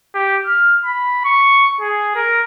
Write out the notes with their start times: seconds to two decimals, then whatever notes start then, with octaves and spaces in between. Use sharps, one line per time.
0.15 G4
0.47 F6
0.85 B5
1.25 C#6
1.81 G#4
2.16 A#4